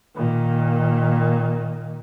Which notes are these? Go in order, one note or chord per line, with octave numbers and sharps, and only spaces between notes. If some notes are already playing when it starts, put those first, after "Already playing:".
A#2 D#3